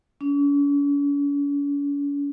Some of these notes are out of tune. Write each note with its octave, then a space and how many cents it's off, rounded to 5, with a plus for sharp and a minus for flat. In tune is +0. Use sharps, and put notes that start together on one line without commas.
C#4 +45